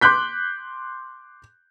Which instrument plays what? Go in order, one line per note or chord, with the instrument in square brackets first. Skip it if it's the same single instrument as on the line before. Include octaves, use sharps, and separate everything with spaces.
[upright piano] C6 D6 F#6 G6 B6